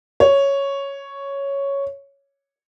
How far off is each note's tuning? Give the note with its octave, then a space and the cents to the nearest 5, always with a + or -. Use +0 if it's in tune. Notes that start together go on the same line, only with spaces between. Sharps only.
C#5 +0